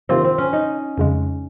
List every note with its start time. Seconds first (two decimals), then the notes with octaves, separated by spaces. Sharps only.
0.09 C3 D#3 A#3 C4 F4 C5
0.24 C4
0.38 C#4
0.53 D#4
0.98 F2 C#3 G#3